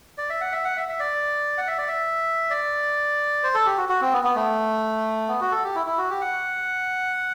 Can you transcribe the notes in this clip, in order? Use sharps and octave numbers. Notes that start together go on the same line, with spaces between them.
D5
E5
F#5
E5
F#5
E5
E5
D5
F#5
E5
D5
E5
D5
C5
A4
G4
F#4
F#4
C4
B3
B3
A3
B3
F#4
A4
G4
E4
E4
F#4
G4
F#5